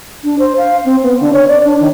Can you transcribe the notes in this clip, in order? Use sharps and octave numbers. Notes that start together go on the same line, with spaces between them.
D4
C5
F5
C4
B3
D3
C#5
D5
D4
D#3